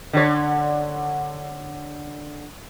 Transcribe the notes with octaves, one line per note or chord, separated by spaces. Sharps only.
D3 C#5